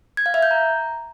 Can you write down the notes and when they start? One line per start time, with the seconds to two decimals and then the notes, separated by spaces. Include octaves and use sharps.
0.17 G#6
0.26 F5
0.34 E5
0.42 G6
0.51 A#5